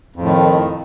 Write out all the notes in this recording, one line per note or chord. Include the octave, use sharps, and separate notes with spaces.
F2 A2 D#3